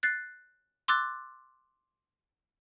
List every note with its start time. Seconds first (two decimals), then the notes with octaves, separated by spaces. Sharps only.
0.03 F#6 A6 C7
0.88 C6 D6 E6 F#6 A6